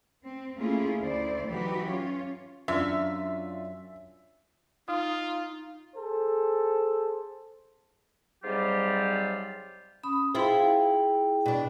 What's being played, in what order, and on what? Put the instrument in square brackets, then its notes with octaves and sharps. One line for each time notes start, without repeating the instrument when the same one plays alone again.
[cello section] C4
A3 A#3 C#4 E4 F4 G#4
D2 E4 C5 D5
E3 F#3 D#4 F#4 G4 B4
C#4 F4 C#5
[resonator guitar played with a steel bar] F#2 [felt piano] D4 F4 [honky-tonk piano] E5
[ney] D#4 [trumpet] F4 [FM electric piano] F5 D#6
[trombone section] G#4 A4 C5
[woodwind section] G#2 C3 F#3 G3 F4 G4
[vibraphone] C#4 B5 D#6
[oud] E4 F4 C5 [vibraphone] G#4 G5
[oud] B2 D4